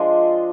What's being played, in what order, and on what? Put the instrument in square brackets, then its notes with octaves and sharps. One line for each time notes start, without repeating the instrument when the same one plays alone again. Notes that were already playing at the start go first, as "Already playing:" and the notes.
Already playing: [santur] F3 G#3 D4 F4 D#5